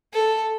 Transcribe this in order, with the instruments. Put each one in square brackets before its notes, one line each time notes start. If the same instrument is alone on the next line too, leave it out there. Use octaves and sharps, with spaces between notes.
[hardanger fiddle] A4